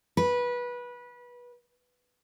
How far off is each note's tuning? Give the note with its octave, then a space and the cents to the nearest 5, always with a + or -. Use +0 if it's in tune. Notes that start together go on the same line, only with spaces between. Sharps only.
B4 -20